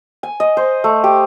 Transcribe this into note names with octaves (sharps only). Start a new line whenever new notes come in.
G#5
D#5
C5
A3
G4